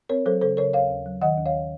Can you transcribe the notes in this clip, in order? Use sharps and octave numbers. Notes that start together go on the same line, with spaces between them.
C4 A#4 C#5
F#3 A4 C5
C#3 A4 C5
C#3 A#4 C#5
D#2 C#5 F5
D#2
F#3
D#3 D#5 F#5
D#2
C#5 F5